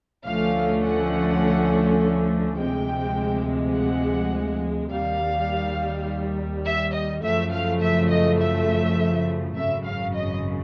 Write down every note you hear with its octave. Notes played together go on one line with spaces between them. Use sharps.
D2 D3 F3 A3 C#4 F5
F#5
D2 C3 F3 G#3 G5
F#5
D#2 D#3 G3 F5
E5
D#5
F#2 C#3 F3 A3 E5
F5
E5
D#5
E5
G#1 F#2 C#3 E5
F5
D#5